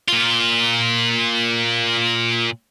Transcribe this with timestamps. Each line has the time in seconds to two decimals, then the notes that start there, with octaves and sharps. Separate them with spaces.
0.08 A#2 F4